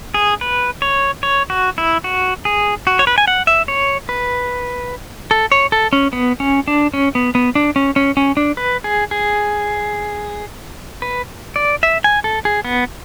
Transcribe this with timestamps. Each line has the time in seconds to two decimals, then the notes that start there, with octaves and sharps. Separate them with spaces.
0.14 G#4
0.41 B4
0.82 C#5
1.23 C#5
1.50 F#4
1.78 E4
2.04 F#4
2.45 G#4
2.87 F#4
2.99 C#5
3.07 B4
3.18 G#5
3.28 F#5
3.47 E5
3.68 C#5
4.09 B4
5.31 A4
5.52 C#5
5.72 A4
5.93 C#4
6.13 B3
6.40 C#4
6.68 D4
6.94 C#4
7.15 B3
7.35 B3
7.55 D4
7.76 C#4
7.96 C#4
8.17 C#4
8.37 D4
8.57 B4
8.84 G#4
9.11 G#4
11.02 B4
11.56 D5
11.83 E5
12.04 G#5
12.24 A4
12.45 G#4
12.65 B3